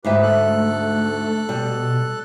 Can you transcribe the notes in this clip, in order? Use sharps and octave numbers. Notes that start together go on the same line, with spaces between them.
D2 G#2 G4 B4 E5
A3 A4 F#6
B2 G3